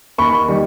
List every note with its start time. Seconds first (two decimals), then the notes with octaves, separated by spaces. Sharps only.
0.18 D#2 B5 C#6
0.48 D#3 G3